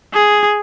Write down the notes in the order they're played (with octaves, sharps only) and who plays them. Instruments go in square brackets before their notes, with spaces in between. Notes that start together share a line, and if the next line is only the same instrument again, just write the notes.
[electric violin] G#4